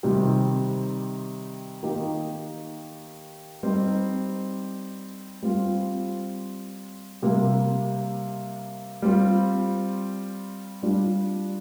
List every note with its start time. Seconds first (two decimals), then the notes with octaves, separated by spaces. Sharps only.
0.03 C3 D#3 G3 C4 G4
1.83 D#3 A#3 D#4 G4
3.63 G3 C4 D#4
5.42 G3 C4 F4
7.22 C3 G3 A#3
9.02 G3 C4 F4
10.82 G3 D4 F4